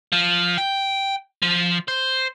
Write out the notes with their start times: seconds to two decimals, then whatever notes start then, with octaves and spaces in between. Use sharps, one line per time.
0.12 F3
0.58 G5
1.42 F3
1.88 C5